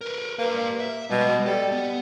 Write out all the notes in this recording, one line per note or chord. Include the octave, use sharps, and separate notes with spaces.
A#4 B4
A#3 G4 B4
E5
B2 G3 G#3
G3 A4
B3